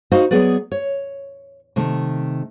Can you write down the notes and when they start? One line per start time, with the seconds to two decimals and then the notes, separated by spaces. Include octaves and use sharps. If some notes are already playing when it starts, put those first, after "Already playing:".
0.12 D#4 F#4 C5 D#5 F5
0.31 F#3 B3 G#4 B4 D5
0.72 C#5
1.76 C3 D#3 A3